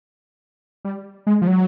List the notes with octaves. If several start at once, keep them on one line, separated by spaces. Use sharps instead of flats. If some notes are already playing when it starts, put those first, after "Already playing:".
G3
G#3
F3
F#3